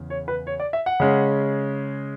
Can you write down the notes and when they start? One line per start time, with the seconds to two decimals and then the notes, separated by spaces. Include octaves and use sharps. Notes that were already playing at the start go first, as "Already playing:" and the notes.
Already playing: E2 C#3
0.10 C#5
0.28 B4
0.47 C#5
0.60 D5
0.73 E5
0.86 F#5
1.00 C#3 G#3 C#4